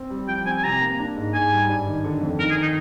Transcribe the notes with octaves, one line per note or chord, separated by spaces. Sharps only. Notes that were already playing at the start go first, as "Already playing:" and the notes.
Already playing: C4
G3
F3 G5
C4 G#5
G#5
C3 A#5
A#3
D4
G#2
G#2 G#5
G3
G2
D#3
D3
F2
D#3 A#4
G#4
D#3
D#4